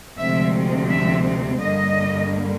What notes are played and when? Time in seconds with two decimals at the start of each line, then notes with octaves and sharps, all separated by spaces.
0.18 D2 C3 F3 G#3 C4 E5
0.90 E5
1.61 G2 D3 G3 A#3 D#5